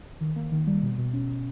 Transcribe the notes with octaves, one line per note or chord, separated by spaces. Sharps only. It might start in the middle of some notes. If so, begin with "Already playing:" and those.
D#3
A#3
D#3
G3
B2
B2
C#4